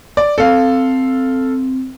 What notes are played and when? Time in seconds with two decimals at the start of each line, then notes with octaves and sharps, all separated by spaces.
0.17 D5
0.38 C4 A4 F5